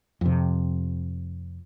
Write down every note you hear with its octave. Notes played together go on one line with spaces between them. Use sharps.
F2 C3